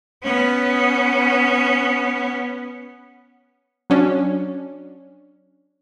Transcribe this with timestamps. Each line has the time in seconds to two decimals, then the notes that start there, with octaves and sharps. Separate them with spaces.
0.23 B3 C#4
3.90 F#3 C#4 D4